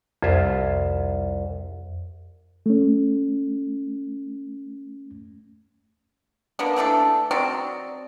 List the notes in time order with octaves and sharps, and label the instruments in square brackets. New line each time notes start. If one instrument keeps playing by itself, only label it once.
[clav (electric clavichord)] C2 F4 E5 [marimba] F2
[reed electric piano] A3 C#4
[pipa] A#3 B3 D4
E3 A3 D4 A4
F#3 C4 D#4 D5